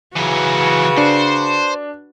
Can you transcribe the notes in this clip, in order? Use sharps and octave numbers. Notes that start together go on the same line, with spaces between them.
C#3 E3 F#3 F#4 B4
D4 C5